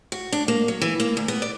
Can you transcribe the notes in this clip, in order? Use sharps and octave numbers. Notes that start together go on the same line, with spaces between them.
F#4
D4
A#3
F#3
E3
A#3
D2
B3
D5